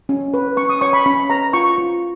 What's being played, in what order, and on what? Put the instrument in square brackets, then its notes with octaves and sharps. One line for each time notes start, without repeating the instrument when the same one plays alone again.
[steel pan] C#4
B4
C#4 C#6
D#6
C#5 C#6
B5
C#4 B5
B4 A#5
F4 C#6
F4